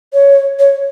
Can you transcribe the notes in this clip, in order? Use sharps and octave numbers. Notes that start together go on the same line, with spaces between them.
C#5
C#5